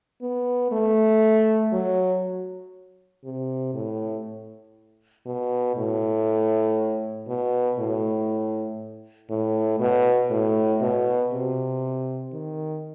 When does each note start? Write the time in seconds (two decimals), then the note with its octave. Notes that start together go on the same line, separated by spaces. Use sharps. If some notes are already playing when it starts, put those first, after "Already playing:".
0.22 B3
0.72 A3
1.73 F#3
3.24 C3
3.74 A2
5.26 B2
5.77 A2
7.28 B2
7.79 A2
9.30 A2
9.80 B2
10.31 A2
10.81 B2
11.33 C3
12.33 D#3